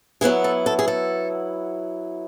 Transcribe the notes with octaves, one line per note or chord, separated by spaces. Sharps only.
F#3 B3 E4 G#4
A4
A4
G#4
A4